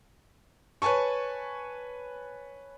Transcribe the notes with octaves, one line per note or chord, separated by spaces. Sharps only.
B4 C#5 G#5 A5 C#6